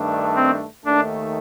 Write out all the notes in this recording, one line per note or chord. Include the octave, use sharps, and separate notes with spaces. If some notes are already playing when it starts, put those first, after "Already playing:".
Already playing: G2 D#3 A3 D4
C4
D#2 D#3 A3 D4